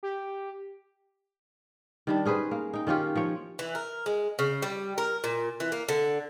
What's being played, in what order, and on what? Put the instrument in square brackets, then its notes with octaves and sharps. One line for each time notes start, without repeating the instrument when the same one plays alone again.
[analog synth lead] G4
[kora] D#3 G3 D4
C#4 G#4 B4 C5
A#3
D#4 G5
D#3 C#4 F4 G4
F3 C#5
[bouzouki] E3
A#4
G#3
C#3
G3
A#4
A#2
E3
A#3
D3